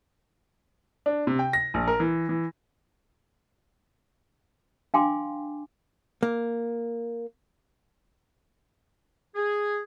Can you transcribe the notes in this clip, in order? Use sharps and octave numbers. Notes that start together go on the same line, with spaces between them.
D4
C3
G5
A#6
A#1
A#4
E3
E3
D4 F5 G5 G#5 C6 D6
A#3
G#4